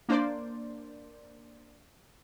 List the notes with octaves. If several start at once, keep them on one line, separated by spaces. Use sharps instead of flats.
A#3 D4 C5 D5